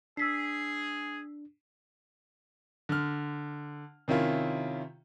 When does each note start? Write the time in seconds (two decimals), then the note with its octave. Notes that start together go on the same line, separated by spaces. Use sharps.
0.17 D4 G#4 E6 B6 C7
2.89 D3 F6
4.08 C3 D#3 C#4 E4 F4